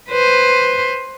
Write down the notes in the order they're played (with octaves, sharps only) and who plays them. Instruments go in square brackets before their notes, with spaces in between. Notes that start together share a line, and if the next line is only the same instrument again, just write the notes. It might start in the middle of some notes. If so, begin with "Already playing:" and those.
[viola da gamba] B4 C5